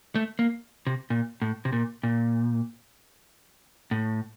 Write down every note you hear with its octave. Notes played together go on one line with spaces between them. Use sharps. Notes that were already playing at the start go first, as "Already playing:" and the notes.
A3
A#3
C3
A#2
A2
C3
A#2
A#2
A2